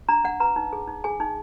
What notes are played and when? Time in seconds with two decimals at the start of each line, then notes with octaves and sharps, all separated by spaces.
0.09 D4 A#5
0.24 D4 F#5
0.40 B4 A#5
0.56 D#4
0.73 G#4
0.88 D#4
1.04 G#4 G#5
1.20 D#4